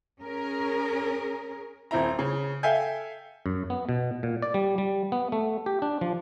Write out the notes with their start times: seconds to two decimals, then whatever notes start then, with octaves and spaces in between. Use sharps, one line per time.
0.22 C#4 G#4 A#4
1.91 D#1 C4 E4 A#5
2.19 C#3
2.63 A4 E5 F5 G5 G#5 G6
3.46 F#2
3.70 B3
3.89 B2
4.23 A#2
4.42 D5
4.54 G3
4.78 G3
5.12 B3
5.32 A3
5.66 G4
5.82 D4
6.01 F3